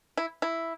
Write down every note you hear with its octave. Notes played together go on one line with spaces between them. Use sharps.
E4
E4